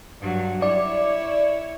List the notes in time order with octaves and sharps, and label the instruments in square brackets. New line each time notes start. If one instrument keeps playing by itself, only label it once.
[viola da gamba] G2 F#3
[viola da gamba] E4 C#5 [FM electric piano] D5